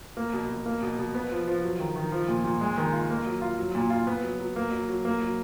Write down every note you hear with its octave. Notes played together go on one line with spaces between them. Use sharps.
A#3
B2
B2
A#3
B2
B2
B3
F3
F3
F#3
D#3
D#3
F3
A#2
A#2
G#3
D#3
F4
A#3
F#3
F4
F#3
A#2
F4
B3
F#3
F#3
A#3
F#3
F#3
A#3
F#3